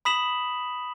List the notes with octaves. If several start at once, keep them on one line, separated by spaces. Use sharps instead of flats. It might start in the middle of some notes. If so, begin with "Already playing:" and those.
B5 D#6 B6 E7 F#7